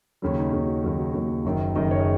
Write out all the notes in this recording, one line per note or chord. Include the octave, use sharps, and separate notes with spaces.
D#2 C#3 F#3 C#4
D#4
D#2 C#3 F#3 F#4
F#4
D#2 C#3 F#3 F#4
F#4
D#2 C#3 F#3 F#4
F#1 F#2 D#3
F#1 F#2 D#3 D#5
C#5
G#4